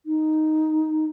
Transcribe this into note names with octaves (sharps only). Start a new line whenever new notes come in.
D#4